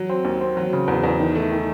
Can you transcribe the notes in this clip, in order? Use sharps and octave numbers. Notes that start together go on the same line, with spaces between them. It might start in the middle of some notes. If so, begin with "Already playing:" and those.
Already playing: F#3
C4
D#2
C4
F#3
C#3
E2
E2
D#3
A3
D#3